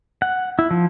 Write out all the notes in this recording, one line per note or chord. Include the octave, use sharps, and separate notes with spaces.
F#5
E4
F3